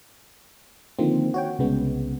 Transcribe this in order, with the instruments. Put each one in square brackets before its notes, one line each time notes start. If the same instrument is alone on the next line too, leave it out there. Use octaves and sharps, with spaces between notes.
[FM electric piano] D3 D#3 F3 A#3 C4
F#4 C#5 G5
C2 C#3 G#3 B3